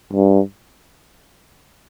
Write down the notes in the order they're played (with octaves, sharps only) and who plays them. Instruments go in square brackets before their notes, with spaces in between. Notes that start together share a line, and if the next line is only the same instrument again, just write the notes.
[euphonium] G2